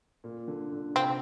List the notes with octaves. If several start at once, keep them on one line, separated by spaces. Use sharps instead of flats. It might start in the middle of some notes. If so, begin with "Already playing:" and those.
A#2
D3
D3
C3 C4